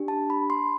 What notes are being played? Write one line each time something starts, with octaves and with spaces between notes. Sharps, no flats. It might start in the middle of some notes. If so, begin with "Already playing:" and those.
Already playing: D4 G4
A5
B5
C6